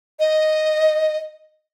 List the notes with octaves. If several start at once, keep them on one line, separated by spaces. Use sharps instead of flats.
D#5